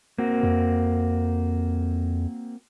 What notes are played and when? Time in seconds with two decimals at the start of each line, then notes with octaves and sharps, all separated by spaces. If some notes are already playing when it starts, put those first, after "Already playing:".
0.18 A#3 C4 F#4
0.43 F2